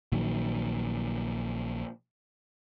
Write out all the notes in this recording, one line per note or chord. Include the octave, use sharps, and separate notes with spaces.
A#1 A#2 D#3 F#3